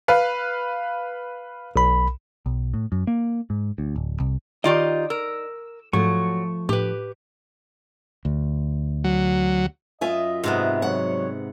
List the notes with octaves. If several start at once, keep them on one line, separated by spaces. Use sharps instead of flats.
B4 F5
B1 B5
B1
A2
F#2
A#3
G#2
D2
D1
C2
D#3 D#4 F4 G4 D5 D#5
A#4 E6
G#2 F3 F#3 A3 C#6
A2 G4 B4
D2
F#3
F#2 F4 D#5 E5 G#5
G#2 C3 B3
F#3 G3 C#5 F#5